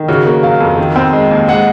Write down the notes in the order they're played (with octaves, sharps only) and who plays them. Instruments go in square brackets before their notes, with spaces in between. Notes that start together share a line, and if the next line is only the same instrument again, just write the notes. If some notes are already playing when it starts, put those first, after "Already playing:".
Already playing: [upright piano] D#3
[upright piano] C#3 [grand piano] F#4
[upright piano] A#3
[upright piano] F#3 [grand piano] F5
[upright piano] F2
D#3
C4
G#3
D#2
[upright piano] G#3 [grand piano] F#5